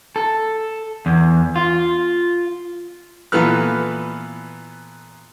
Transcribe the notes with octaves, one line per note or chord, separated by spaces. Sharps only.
A4
E2
F4
A#2 E3 B3 A4 B4 F6